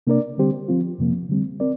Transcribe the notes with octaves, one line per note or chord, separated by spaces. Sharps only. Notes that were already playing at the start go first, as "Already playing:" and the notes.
C3 A#3 D4 A#4 D5
D3 G3 C4 G4 C5
F3 C4 F4
F2 C3 F3 A#3
D3 G3 C4
C4 A#4 D5